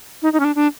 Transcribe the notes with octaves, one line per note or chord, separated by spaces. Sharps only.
D#4
D#4
C#4
D4
D4